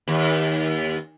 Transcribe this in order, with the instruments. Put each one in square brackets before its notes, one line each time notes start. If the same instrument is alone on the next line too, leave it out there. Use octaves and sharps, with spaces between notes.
[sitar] D#2